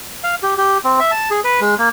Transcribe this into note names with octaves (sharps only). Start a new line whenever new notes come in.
F5
G4
G4
C4
E5
A5
G#4
B4
G#3
A#3